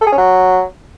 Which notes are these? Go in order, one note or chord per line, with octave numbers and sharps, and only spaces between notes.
A4
G#4
C#4
F#3